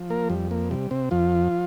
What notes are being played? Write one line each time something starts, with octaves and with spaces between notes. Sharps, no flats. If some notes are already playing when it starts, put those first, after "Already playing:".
Already playing: F3
A#3 A#4
F2 G3
A#3
C3 G3
C3 C4
F2 F3 F4